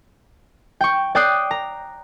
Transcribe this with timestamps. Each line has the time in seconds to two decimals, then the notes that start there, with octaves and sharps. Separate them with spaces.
0.81 G5 C#6
1.15 D5 G5 D#6 F#6 C7
1.51 A#5